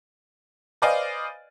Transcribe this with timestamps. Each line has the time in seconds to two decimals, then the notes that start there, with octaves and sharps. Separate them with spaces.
0.82 B4 C5 D5 D#5 F5 G#5